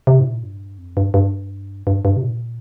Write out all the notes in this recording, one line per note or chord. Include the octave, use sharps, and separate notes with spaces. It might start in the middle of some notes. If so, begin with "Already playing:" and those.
C3
G#2
A#2
G2
F2
G2
G2
G2
G2
C3
A#2